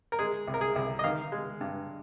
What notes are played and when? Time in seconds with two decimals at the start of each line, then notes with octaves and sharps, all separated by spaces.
0.12 A#4
0.19 G#3 G#4
0.48 C2
0.54 A#4
0.61 G#4
0.76 C2
0.99 D#5
1.04 D#3 F5
1.32 G#3
1.61 G2